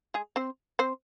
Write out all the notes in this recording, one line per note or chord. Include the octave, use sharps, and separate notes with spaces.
G#3 G#4
C4 C5
C4 C5